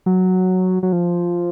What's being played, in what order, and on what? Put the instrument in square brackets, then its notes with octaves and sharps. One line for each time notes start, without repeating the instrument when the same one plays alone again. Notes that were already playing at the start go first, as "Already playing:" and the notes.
[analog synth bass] F#3
F#3
F3